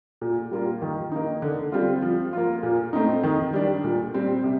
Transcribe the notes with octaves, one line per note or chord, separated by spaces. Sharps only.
A#2
G3 A#3 F4
D#3
A#3 D#4
D3
G3 C4 F4
F3
A#3 F4
A#2
A3 C4 D#4
D#3
G3 D4
A#2
G3 C4
C3